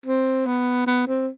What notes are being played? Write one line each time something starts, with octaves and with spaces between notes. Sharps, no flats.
C4
B3
B3
C4